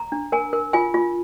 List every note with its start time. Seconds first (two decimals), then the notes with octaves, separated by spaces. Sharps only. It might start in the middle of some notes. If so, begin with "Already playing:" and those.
Already playing: A#5
0.12 D4
0.32 A#4 G#5
0.53 A#4
0.73 F4 G#5
0.94 F4